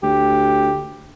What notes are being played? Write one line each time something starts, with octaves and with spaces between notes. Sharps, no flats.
D2 G4